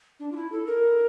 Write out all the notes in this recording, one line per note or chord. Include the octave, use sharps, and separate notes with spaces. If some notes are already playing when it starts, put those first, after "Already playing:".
D4
F4
E4
A4
A#4